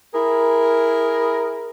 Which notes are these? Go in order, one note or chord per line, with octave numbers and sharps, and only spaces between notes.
E4 G#4 A#4